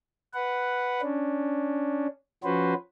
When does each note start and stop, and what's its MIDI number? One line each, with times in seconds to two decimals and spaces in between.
0.34 1.01 71
0.34 1.01 78
1.02 2.07 61
1.02 2.07 62
2.44 2.74 53
2.44 2.74 61
2.44 2.74 66
2.44 2.74 71
2.44 2.74 72